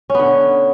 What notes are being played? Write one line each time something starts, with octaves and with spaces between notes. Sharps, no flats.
D3 B3 C#4